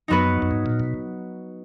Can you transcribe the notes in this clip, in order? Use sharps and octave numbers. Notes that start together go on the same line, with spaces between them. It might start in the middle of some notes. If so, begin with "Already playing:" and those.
F#2 F#3 B3 D#4 F#4 B4
F#2
G#2
A#2
B2